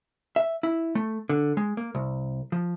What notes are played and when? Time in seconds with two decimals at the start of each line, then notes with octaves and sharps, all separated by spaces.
0.36 E5
0.63 E4
0.95 A3
1.29 D3
1.57 G#3
1.77 A#3
1.95 C2
2.52 F3